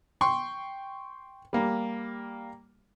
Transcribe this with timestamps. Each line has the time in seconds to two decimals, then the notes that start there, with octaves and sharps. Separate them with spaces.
0.21 G5 C6 C#6
1.53 G3 A#3